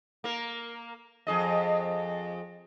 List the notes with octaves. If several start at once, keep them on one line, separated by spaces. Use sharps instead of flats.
A#3 A#4
F2 G#4 D#5